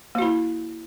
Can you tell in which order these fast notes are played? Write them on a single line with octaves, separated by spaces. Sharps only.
A#3 F#4 E4